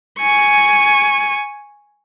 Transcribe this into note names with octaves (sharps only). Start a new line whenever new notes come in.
G#5 C#6